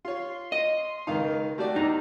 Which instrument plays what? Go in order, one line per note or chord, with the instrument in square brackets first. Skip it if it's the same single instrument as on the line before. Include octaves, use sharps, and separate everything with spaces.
[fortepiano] F4 C#5 [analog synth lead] C6
[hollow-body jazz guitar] D#5
[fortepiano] C#2 D#3 F5 [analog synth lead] D#4
[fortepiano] A3 F#4 D5 [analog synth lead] G4
[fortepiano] E2 [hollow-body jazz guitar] D#4